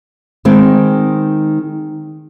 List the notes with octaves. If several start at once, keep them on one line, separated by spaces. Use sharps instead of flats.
D#3 G#3 C4